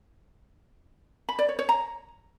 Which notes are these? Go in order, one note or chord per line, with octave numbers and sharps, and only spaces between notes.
B5
D5
C#5
C#5
A#5